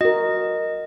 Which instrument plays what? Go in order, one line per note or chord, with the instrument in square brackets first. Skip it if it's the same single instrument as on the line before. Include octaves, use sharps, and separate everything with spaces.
[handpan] F#4 A#4 [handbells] D#5